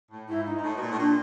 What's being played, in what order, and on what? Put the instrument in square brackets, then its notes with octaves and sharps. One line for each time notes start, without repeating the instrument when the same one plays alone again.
[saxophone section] A2
[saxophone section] G#2 [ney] E4
[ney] D#4
[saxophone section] G#2
[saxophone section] A2 [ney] D#4 E4
[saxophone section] B2
A#2
A2
[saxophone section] A#2 [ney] D4